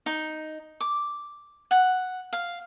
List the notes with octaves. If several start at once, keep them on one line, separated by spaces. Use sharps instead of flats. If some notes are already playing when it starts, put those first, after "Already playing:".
D#4
D6
F#5
F5